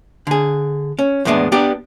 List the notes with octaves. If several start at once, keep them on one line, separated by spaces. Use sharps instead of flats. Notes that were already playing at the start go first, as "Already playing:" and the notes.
D3 G#4
C#4
E2 A2 G#3 B3 D4
B3 D4 G4